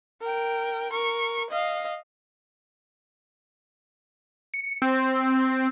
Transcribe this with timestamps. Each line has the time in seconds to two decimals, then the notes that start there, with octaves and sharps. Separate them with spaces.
0.21 A#4 G5
0.92 A#4 C#6
1.51 D#5 F5
4.54 C#7
4.82 C4